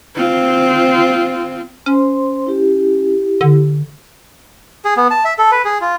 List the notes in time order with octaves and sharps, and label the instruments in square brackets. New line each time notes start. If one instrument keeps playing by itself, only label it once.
[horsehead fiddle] C4 F4
[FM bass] C#4 [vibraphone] C5 C6
[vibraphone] E4 G4
[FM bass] D3
[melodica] G#4
B3
A5
E5
A4
B4
G#4
F4